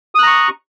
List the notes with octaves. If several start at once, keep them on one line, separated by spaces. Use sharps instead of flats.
A#5 C#6 D#6 F#6